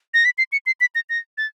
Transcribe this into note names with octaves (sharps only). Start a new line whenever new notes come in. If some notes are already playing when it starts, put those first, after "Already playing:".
A#6
B6
C7
C#7
C7
B6
A#6
A#6
A6